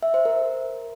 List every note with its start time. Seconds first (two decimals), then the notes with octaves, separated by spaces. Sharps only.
0.03 E5
0.14 C5
0.25 A#4